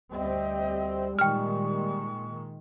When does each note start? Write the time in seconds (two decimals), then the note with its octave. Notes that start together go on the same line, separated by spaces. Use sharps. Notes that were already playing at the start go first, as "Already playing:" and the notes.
0.12 D2 G3 C4 G4 D#5 E5
1.19 A#2 D#3 G#3 G5 C#6 F6